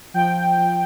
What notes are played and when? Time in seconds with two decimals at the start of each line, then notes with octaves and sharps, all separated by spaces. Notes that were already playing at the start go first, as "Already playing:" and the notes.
0.14 F3 G5
0.59 F3